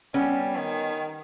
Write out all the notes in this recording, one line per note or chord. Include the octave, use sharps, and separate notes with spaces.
G3 B3 C#4
D#3